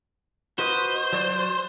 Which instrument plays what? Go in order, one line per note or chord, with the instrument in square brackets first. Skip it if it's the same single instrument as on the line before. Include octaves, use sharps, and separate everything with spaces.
[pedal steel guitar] F#4 B4 D#5 [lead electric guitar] C5
[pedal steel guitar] F#3 D5 C6